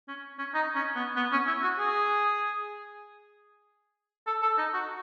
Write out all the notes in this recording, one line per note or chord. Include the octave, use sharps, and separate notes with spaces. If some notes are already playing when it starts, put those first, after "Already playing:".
C#4
C#4
D#4
C#4
B3
B3
C#4
E4
F#4
G#4
A4
A4
D#4
F#4